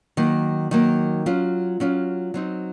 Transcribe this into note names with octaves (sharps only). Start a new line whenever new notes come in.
D#3 F#3 A#3
D#3 F#3 A#3
F#3 C#4 F4
F#3 C#4 F4
F#3 C4 D#4